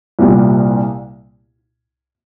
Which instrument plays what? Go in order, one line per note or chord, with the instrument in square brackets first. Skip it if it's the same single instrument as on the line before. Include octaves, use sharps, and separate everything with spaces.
[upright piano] C2 A#2 G3